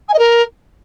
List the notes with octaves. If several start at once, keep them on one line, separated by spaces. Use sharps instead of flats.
G#5
D#5
A#4